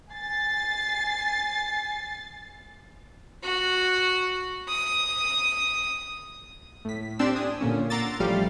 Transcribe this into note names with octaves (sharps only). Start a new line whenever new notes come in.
G#5 A6 C7
F#4
D#6
A2 B6
C4 D4 G4 C6 E6
G#5 D#6
A#2 D3 A#3 C#4
F#5 A#5 C6 D6 E6 A6
A1 F3 G3 A3 F5